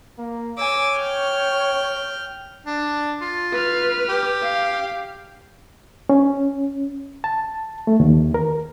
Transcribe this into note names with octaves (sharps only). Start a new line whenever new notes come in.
A#3
C#5 G#5 D6 E6
G5 F6 G6
D4
F4
B4 F6
G4
F5
C#4
A5
A3
D#2
A#4